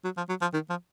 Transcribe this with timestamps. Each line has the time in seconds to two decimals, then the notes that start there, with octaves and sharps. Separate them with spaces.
0.04 F#3
0.17 F3
0.29 F#3
0.41 F3
0.54 D#3
0.70 F3